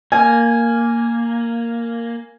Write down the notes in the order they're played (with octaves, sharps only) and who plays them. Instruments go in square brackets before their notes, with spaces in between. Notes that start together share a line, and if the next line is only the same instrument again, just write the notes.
[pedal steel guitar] A#3 [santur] G#5